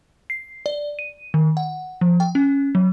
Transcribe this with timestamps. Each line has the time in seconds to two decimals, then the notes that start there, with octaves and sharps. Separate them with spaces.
0.30 C7
0.66 D5
0.99 D#7
1.34 D#3
1.57 F#5
2.01 F3
2.20 G5
2.35 C#4
2.75 F#3